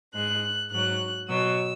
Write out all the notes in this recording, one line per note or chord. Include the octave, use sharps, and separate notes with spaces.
G#2 G#3 F#6
G#2 F#3 F#6
B2 F#3 E6